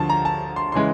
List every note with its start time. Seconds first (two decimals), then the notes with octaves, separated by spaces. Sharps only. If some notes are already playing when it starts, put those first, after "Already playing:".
Already playing: D2 D3 F3 A5
0.09 A#5
0.25 A5
0.56 C6
0.72 C#3 E3 G#3 C6